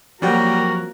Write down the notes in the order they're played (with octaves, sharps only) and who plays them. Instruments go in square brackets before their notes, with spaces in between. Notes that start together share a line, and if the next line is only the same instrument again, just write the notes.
[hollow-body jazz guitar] F2 F#3 [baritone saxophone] G3 [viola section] A#3 A#4 [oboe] F#4